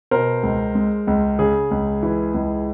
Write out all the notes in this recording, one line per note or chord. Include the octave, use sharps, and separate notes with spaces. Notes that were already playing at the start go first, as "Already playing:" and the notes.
B2 A#4 C5
C#2
G#3
C#2
C#3 G#4
C#2
E3
C#2